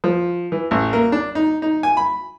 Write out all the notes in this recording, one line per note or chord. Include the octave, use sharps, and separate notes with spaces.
F3
E3
A1
A#3
D4
D#4
D#4
G#5
B5